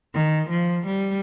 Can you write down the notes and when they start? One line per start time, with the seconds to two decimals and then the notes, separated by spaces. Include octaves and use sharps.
0.14 D#3
0.50 F3
0.86 G3